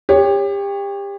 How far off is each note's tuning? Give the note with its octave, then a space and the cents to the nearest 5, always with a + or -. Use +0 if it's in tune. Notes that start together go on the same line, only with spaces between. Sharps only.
G4 +30 C#5 +0